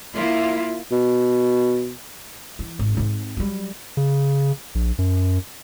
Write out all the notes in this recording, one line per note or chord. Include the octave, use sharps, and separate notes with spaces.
A#3 E4 F4
B2
E3
G#1
G#2 C4
F#3 G3
C#3
A#1
F#2